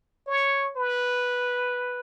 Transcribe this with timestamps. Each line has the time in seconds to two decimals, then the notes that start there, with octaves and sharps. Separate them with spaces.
0.27 C#5
0.76 B4